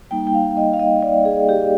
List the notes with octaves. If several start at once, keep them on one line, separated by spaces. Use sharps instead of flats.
G3 A#3 D#4 G5
G5
F5
D#5
F5
D#5
D5
G#4
G4